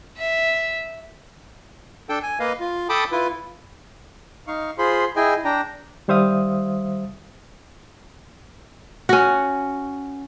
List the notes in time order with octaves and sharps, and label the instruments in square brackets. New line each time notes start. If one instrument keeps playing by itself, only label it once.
[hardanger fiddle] E5
[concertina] D4 A4 G5
G#5
A#3 B4 D#5 F5
F4
A4 G5 A5 B5 D6 D#6
E4 F4 B4
[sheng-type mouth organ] D#4 F5 C#6
F4 G#4 C5 B5 C6
E4 G#4 D#5 G5 G#5
D4 G5 A#5
[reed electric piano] D#3 G3 C5 E5 F5 D#6
[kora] C#4 F#4